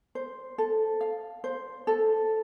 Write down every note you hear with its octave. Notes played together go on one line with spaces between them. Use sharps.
C5
A4
F5
C5
A4